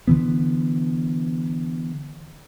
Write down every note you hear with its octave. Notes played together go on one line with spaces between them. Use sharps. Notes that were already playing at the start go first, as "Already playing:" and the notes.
D3 E3 B3